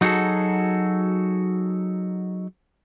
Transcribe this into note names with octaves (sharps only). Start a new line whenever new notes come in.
F#3 D#4 F#4 G#4 A4